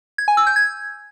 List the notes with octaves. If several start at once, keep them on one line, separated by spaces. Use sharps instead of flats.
G#6
G#5
E6
G6
G#6